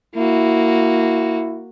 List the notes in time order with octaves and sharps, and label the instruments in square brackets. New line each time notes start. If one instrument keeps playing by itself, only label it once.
[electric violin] A#3 F#4 [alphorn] E4